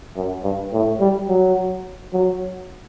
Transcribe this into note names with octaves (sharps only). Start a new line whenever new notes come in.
F#2
G2
A2
G3
F#3
F#3